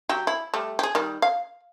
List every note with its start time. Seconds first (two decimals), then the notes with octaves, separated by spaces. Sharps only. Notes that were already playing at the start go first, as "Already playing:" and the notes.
0.09 F#3 G4
0.27 E4
0.54 G3 A3
0.79 G4 G#4
0.95 D#3 G3
1.22 F5